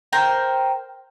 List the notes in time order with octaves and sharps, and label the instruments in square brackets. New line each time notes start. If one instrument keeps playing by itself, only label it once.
[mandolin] A#4 C5 G5